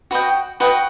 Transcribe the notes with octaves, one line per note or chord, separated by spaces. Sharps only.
F#4 B4 D#5 G5
F#4 B4 D#5 G5